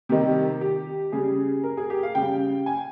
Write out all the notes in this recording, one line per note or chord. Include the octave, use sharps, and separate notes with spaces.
C3 D#3 G3 G4
G4
C#3 G3 G#4
A#4
G#4
G4
F5
C#3 G3 G5
G#5